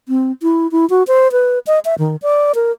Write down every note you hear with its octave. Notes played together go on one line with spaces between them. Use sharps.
C4
E4
E4
F#4
C5
B4
D#5
E5
D#3
D5
A#4